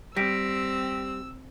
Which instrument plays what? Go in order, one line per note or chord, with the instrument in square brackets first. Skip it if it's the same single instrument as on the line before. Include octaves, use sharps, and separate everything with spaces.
[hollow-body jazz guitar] G3 [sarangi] C4 [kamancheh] E6 [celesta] A#6 B6 D7